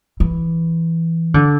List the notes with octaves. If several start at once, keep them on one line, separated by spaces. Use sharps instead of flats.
E3
D3